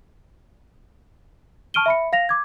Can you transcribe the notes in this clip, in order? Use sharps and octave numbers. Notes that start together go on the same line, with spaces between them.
A5 C#6 F6 D7 D#7 G7
E5 B5 C#7
F5 A#6 F7
D6 G#6